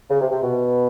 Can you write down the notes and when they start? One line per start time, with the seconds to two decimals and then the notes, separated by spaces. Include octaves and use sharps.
0.10 C#3
0.21 C3
0.31 C3
0.42 B2